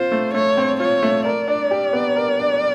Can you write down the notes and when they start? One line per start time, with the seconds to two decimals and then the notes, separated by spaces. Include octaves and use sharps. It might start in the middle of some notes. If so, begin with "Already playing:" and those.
Already playing: C4 F4 C5
0.12 A3
0.34 A3 C#5
0.57 C4
0.80 F4 C#5
1.02 A3
1.25 A#4 D5
1.48 D4
1.71 G4
1.93 B3
2.16 A#4
2.39 D4